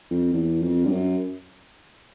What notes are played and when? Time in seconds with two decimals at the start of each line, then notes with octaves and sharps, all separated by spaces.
0.11 F2
0.33 E2
0.62 F2
0.85 G2
0.91 F#2